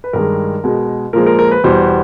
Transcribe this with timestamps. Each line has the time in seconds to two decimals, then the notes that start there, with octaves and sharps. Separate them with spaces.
0.04 B4
0.13 G2 D#3 G#3 A#4
0.64 B2 G#3
1.13 A#2 F3 G#3 A#4
1.26 A#4
1.39 A#4
1.51 B4
1.64 E2 B2 G3 C5